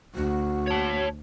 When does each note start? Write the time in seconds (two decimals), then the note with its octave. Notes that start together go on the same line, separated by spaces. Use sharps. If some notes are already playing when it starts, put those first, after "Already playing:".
0.15 D2 F#4
0.67 C#5 A5